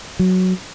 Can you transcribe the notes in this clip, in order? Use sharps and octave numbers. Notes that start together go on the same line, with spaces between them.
F#3